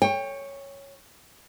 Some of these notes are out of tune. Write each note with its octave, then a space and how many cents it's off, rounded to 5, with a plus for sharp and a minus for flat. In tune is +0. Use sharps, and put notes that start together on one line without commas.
C#5 +0 G5 +25